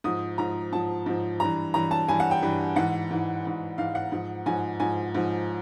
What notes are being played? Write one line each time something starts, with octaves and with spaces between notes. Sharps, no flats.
G#2 F3 D#6
G#2 F3 A#5
G#2 F3 A5
G#2 F3
G2 E3 A#5
G2 E3 A#5
A5
G2 E3 G#5
F#5
G5
G2 E3
G#2 E3 F#5
G#2 E3
G#2 E3
G#2 E3 F5
F#5
G#2 F3
G#2 F3 G#5
G#2 F3 G#5
G#2 F3